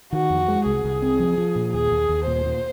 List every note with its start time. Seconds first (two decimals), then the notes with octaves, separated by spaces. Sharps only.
0.13 D#3 F#4
0.30 F2
0.48 G#3
0.66 C2 G#4
0.84 C2
1.02 C4
1.19 F3
1.38 F3
1.56 A#2
1.73 D#2 G#4
1.91 D#2
2.09 D#2
2.27 A#2 C5
2.45 A#2